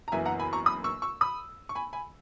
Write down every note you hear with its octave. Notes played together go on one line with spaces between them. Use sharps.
A#5
F#1 F#2 E3 B3 E5 G#5
F#5 A#5
G#5 B5
A#5 C#6
B5 D#6
C#6 E6
C#6 E6
B5 D#6
C#6
G#5 B5
G#5 B5